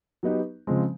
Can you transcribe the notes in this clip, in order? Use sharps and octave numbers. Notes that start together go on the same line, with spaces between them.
F#3 B3 D#4 G4 B4
C#3 F3 G#3 C4